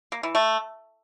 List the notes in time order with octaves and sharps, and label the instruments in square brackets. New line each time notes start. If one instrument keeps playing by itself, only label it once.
[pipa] A#3
E3
A3